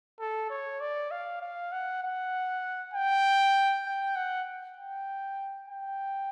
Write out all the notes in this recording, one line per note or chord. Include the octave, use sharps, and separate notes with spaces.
A4
C#5
D5
F5
F5
F#5
F#5
G5
G5
F#5
G5
G5